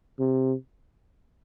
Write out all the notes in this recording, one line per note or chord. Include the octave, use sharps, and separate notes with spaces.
C3